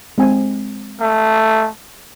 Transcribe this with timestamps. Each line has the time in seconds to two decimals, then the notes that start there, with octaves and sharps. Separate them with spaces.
0.18 G#3 C4 G#5
1.01 A3